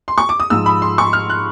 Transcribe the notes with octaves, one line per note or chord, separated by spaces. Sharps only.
C6
C#6
D6
D#6
G#2 F3 E6
B5
C6
C#6
F6
F#6